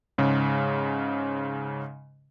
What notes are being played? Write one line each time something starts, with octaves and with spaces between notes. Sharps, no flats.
G#2 C#3